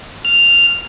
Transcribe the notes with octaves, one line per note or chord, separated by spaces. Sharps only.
F6